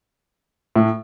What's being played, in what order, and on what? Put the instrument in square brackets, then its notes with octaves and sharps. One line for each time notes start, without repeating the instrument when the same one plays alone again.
[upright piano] A2